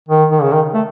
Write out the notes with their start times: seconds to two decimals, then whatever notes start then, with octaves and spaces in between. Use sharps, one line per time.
0.09 D#3
0.31 D#3
0.42 C#3
0.53 D#3
0.74 A3